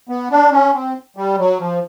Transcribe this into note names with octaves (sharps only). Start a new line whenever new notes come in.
B3
D4
C#4
C4
G3
F#3
F3